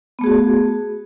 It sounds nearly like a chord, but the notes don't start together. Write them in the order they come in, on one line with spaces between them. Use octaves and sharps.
B3 A3 G#4 F#4